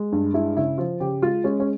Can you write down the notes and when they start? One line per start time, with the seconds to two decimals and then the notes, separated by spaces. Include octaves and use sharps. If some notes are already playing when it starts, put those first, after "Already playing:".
Already playing: G#3
0.12 G2
0.34 G#3 E4
0.57 C#3 E4
0.78 F3 F4
1.00 C#3 G4
1.22 G#3 F4
1.44 G#3 C#4
1.60 C#4